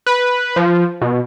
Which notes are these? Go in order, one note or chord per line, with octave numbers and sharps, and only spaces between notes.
B4
F3
B2